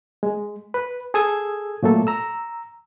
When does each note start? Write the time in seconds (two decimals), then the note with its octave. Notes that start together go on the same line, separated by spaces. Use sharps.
0.23 G#3
0.74 B4
1.14 G#4 A4 D#6 E6 G#6
1.83 A#2 F#3 A3 A#3 A4
2.07 A#5 E6